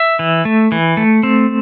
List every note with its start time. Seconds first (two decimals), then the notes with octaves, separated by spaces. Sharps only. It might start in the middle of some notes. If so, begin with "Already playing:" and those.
Already playing: E5
0.19 E3
0.45 A3
0.72 E3
0.97 A3
1.23 C4